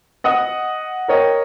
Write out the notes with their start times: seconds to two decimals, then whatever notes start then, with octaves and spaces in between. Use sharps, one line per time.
0.24 D#5 F#5 D#6
1.08 A#4 C#5 D#5 G5